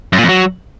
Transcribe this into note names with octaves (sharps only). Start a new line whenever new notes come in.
F#2
A#2
F2
F#3